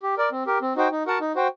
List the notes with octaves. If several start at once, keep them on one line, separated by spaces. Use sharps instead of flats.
G4
A#4 D5
C4
G4 A#4
C4
D#4 F#4 C5 G5
D#4
F#4 A#4 F#5 A5
D#4
F#4 C5 G5